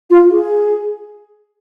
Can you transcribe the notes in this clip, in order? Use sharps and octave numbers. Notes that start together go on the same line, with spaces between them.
F4
G#4